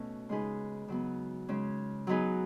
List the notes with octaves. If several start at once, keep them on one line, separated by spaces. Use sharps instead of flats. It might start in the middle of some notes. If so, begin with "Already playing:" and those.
Already playing: B2 A3 C#4
C#3 G#3 D#4 G#4 B4
C#3 F#3 B3
C#3 G#3 C#4
F#3 B3 D#4 G#4 B4